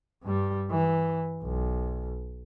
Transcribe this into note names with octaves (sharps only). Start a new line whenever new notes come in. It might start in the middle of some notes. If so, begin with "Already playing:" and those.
G2 G3
E3
B1